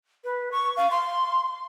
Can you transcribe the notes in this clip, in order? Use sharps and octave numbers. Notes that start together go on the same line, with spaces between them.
B4
C#6
F5
C6